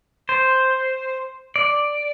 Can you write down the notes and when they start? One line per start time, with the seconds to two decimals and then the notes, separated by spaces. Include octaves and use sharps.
0.29 C5
1.56 D5